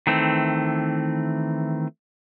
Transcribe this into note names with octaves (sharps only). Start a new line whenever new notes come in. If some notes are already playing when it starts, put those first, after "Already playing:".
D#3 E3 A3 C4